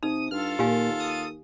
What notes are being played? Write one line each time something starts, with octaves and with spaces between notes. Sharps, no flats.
C3 D#4 D#6
G2 F4 A4 F6
D#2 A#2 G4 F5 G#5
D#6